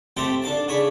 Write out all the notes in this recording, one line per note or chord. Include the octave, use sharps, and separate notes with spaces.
A3 C4 G4 A4 G5
D4 A4 F5 A5
C#3 D4 C#5 B5